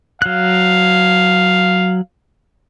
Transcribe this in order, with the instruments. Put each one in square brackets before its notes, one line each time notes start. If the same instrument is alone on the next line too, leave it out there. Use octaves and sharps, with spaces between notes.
[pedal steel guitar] F#3 F#6 [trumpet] F5